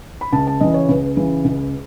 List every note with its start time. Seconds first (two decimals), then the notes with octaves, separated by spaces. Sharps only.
0.21 B5
0.32 C#2 A5
0.47 A5
0.60 C#3 E3 D#5
0.74 C#5
0.89 C#2 B4
1.17 C#3 E3
1.44 C#2